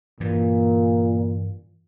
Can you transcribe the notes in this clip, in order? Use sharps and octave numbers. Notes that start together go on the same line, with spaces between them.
G2 A#2 E3